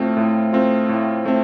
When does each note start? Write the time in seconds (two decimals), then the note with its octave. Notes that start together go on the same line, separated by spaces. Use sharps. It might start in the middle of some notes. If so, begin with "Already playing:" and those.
Already playing: A2 A3 C4 F4
0.17 A2
0.53 A3 C4 F4
0.89 A2
1.26 A3 C4